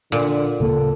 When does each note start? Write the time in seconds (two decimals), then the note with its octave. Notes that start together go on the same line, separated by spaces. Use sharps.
0.12 A#2 D3
0.60 D1 C#3 A#3 A4